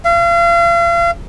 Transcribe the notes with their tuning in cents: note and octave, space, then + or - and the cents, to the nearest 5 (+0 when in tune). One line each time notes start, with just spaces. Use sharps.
F5 -40